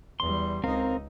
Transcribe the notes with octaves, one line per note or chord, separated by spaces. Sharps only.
E2 G3 C6
C#2 C4 D#4 A#4 F5